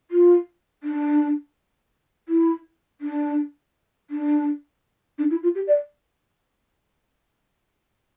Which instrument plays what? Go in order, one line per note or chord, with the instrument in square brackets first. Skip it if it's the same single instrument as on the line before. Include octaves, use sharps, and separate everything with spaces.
[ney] F4
D4
E4
D4
D4
D4
E4
F4
G4
D5